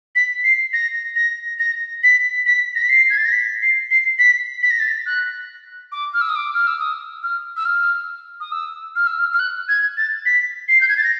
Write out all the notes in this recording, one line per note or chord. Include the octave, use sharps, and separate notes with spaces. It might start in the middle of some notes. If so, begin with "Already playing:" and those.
B6
C7
A#6
A#6
A#6
B6
B6
A#6
B6
C7
G#6
A6
A#6
B6
C7
C7
B6
B6
A#6
A6
A#6
F#6
D6
F6
E6
D#6
D6
F6
E6
D#6
F6
E6
F6
D#6
E6
F6
E6
F6
F6
F#6
G#6
A6
B6
C7
G6
G#6
A6
A#6